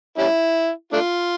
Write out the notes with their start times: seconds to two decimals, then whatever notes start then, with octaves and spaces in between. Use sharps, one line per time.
0.18 G3 C#4 E4
0.93 A3 D4 F4